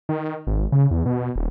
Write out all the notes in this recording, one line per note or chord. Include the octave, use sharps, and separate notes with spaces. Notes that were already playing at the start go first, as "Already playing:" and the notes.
D#3
G#1
C#3
E2
B2
D#1